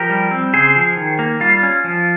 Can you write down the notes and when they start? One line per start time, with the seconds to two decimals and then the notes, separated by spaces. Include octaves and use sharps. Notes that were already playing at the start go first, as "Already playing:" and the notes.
Already playing: F3 G4 A#4
0.10 G3
0.31 C4
0.54 C#3 G#4 C5
0.76 F3
0.97 D#3
1.19 A#3
1.40 G3 F4
1.63 C#4
1.84 F3